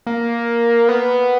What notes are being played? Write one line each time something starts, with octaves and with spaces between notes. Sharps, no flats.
A#3
B3